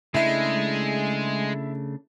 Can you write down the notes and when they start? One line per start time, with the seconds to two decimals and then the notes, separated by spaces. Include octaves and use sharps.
0.14 C#3 G#3 A3 D4 E4 E5